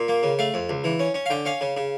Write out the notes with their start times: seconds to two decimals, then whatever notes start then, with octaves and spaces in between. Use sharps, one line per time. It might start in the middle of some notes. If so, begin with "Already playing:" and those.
Already playing: A#2
0.08 A#3
0.23 C#3
0.39 A3 F5
0.54 F2
0.69 C#2
0.84 E3
0.99 C#4
1.14 C#4
1.26 F5
1.30 D3 G5
1.45 C#4 F5
1.61 C#3
1.77 C#3